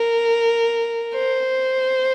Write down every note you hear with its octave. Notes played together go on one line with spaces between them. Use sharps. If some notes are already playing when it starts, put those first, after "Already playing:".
Already playing: A#4
C5